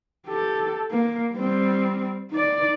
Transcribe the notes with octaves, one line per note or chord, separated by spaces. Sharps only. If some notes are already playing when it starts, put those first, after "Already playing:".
G4 A4
A#3
G3 C4
D#4 D5